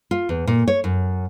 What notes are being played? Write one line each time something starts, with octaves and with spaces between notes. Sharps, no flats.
F4
E2
A#2
C#5
F#2